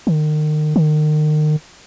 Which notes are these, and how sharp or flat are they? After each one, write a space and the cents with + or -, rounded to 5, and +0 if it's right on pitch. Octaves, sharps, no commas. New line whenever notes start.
D#3 -35
D#3 -35